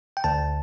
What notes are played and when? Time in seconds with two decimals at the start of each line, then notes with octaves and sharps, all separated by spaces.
0.17 G5
0.24 D2 A5